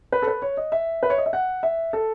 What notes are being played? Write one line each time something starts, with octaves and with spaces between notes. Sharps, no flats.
B4
A4
B4
C#5
D#5
E5
B4
C#5
D#5
E5
F#5
E5
A4